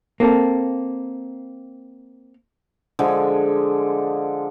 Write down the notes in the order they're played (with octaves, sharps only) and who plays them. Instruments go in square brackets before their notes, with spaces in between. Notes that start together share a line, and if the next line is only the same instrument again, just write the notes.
[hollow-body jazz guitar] A#3 C4 A4
[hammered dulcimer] D3 F3 G#3 D4